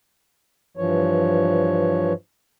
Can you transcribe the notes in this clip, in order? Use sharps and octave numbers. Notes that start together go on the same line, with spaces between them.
G2 E3 F3 C#5